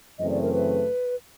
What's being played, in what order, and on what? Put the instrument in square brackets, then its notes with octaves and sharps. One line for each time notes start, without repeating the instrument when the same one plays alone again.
[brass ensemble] F#2 C#3 E3 A3 C4 [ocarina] D#5
[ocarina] D5
A#4
B4